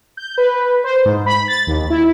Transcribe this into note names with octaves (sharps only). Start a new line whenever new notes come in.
G6
B4
C5
G#2
B5
A6
D#2
E4